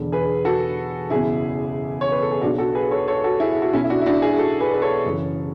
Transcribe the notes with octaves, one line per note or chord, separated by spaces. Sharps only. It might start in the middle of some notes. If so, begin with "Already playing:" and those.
Already playing: E1 E2 D3
G#4 B4
F#4 A4
F#1 E2 B2 E4 G#4
C#5
B4
A4
G#4
B1 B2 D4 F#4
F#4 A4
G#4 B4
A4 C#5
A4 C#5
F#4 A4
E4 G#4
F#4
B1 B2 C#4 E4
E4
D4 F#4
E4
D4 F#4
E4 G#4
F#4 A4
G#4 B4
B4
A4 C#5
F#1 F#2 E3